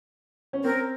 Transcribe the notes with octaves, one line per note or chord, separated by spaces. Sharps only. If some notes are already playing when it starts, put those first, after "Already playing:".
C#4
C4 A#4